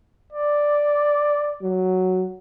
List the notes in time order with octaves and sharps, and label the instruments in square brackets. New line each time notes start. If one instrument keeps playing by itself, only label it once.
[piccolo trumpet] D5
[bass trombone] F#3